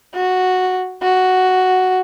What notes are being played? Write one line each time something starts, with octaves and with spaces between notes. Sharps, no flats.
F#4
F#4